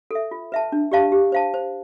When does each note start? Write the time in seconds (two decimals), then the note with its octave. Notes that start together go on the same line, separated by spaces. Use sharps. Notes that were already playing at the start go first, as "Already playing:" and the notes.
0.11 A4 E5
0.31 F4
0.52 B4 E5 A5
0.72 D4
0.92 G4 D5 F5 A5
1.12 G4
1.32 C5 F5 A5
1.54 C5